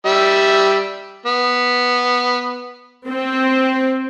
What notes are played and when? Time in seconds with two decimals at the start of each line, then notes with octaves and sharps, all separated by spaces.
0.06 G3 E5
1.26 B3
3.08 C4